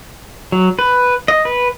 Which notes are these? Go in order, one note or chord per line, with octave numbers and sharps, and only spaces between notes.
F#3
B4
D#5
B4